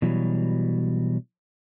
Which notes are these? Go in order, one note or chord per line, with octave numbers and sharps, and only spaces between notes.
B2 E3 F#3 G3